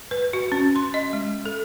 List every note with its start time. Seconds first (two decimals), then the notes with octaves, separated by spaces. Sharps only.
0.11 B4
0.33 F#4
0.52 C#4
0.76 C6
0.94 D#5
1.13 G#3
1.46 A4